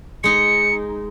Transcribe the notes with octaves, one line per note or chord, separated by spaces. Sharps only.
G#3 D#4 C#7